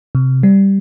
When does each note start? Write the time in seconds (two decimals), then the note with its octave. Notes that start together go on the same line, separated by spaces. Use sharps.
0.15 C3
0.43 G3